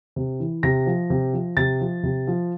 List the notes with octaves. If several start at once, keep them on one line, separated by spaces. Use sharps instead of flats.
C3
E3
C3 A#6
F3
C3
F3
C3 A6
F3
C3
F3